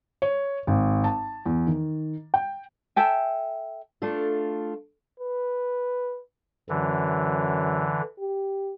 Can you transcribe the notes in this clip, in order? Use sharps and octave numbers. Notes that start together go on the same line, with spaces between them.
C#5
G#1
A5
E2
D#3
G5
A4 E5 G5 G#5
A3 D4 F4 A4
B4
F#2 D3 E3
G4